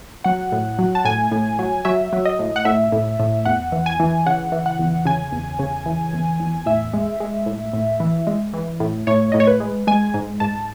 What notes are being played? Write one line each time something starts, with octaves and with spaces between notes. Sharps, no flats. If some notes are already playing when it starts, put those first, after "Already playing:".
F#3 F#5
A2
F#3
A5
A2 G#5
A2
F#3
F#3 E5
F#3
D#5
A2
F#5
A2 E5
A2
A2
E2 F#5
E3
G#5
E3
C#3 F#5
E3
F#5
E2
C#3 G#5
E2
C#3
E3
E2
E2
A2 E5
G#3
G#3
A2
A2
E3
G#3
E3
A2
A2 C#5
A2 D#5
C#5
B4
G#3
G#3 G#5
G#2
G#2 A5